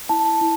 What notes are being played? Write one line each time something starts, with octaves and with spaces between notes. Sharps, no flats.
E4 A5
E4